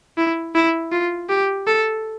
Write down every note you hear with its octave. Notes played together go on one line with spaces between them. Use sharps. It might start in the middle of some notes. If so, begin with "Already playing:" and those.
E4
E4
F4
G4
A4